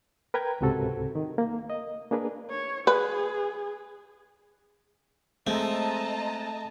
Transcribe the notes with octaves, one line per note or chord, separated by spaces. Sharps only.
A#4 B4 G5 A#5 G#6
C#2 G#2 C3 F#4 A4
D#3
A#3
D#5
A#3 D4 G#4 A#4 B4
C#5
G#4 B4
G#3 A3 C4 D#5 A5 A#5